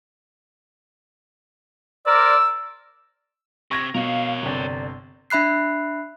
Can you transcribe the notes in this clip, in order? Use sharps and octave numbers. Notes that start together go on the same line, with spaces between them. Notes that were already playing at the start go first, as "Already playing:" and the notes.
A#4 C5 D5 E6
C3 C#6 G#6 A#6
B2 A#4 C#5 F5
G1 C3 D5
D4 E5 B5 F#6 C7